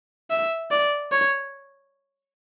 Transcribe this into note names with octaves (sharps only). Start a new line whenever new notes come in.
E5
D5
C#5